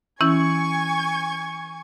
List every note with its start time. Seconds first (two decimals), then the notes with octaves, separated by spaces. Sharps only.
0.21 E3 C#4 E4 G#5 C#6 G#6